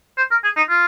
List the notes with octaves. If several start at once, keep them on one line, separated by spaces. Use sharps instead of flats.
C5
A#4
G#4
D#4
F4